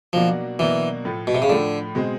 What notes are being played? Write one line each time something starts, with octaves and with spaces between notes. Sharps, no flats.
B2 F3 F#3 A#3 D4 F#4
B2 E3 F#3 A#3 D4 F#4
A2 F3 A3
B2
C3
C#3
A2 D3 F3 A3
B2 G#3 C4